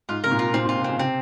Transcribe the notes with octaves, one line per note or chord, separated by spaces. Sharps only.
G#2 F4
C3 A#4
A#2
F4
A#2 C4
A#2
F4
C3
C#3 C4
C3 C4